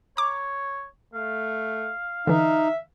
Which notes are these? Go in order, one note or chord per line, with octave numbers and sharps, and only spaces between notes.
C#5 A#5 D6
A3 F5
D3 E3 D#4 E5